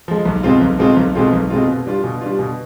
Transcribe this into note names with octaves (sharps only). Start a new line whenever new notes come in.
F3 G#3
B1
B2 G#3 C4 F4
B1
B2 G#3 C4 F4
B1
B2 G#3 C4 F4
B1
B2 G#3 C4 F4
B2
G3 D4 F4
B2
G3 D4 F4
B2